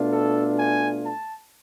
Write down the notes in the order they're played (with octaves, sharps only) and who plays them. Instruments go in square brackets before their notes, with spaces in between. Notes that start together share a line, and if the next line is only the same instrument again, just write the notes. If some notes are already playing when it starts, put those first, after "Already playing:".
Already playing: [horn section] B2 A3 D4 F4
A4
G#5
A5